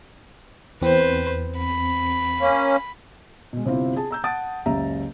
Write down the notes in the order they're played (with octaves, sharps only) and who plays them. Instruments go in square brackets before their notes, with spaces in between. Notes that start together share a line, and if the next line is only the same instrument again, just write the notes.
[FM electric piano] E2 C4 [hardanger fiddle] B4 C5
[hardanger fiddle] B5
[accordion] A#3 C#4
[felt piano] B2 G#3
G1 C3 C4 E4 F4
G#4 A5
A#5 E6 G6
F#5 A5 D#6 A6 D7
F#1 C#2 C#3 G4 E5 A#5